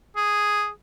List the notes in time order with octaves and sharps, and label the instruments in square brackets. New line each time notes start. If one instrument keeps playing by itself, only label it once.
[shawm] G#4